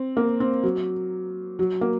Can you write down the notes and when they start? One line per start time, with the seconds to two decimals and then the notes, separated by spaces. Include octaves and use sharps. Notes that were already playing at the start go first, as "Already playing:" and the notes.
Already playing: C4
0.17 A#3
0.40 C4
0.63 F#3
1.59 F#3
1.81 A#3